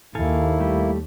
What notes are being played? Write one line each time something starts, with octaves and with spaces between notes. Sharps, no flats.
D#2 A#3 E4 A4 F5 G#5
G3 A3 G4